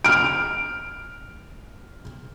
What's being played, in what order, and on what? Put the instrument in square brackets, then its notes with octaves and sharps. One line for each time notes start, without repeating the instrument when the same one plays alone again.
[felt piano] F6 D7